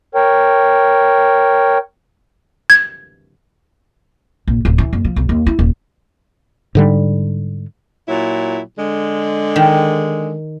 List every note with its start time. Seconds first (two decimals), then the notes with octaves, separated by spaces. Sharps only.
0.15 A#4 C#5 G5
2.70 G#6
4.48 A#1
4.65 D1
4.78 E3
4.93 F#1
5.05 F3
5.16 B1
5.29 D#2
5.46 E4
5.59 D#1
6.75 G#2 D3 G3
8.08 A#2 F#3 E4
8.79 D3 G#3
9.56 D#3